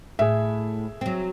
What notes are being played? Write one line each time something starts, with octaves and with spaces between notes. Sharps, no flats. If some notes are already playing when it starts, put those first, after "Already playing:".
A2 G#4 E5
F#3 C4